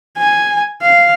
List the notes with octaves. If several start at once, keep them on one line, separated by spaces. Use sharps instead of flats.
G#5
F5